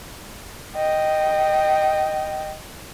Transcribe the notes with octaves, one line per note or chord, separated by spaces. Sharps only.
D#5 G5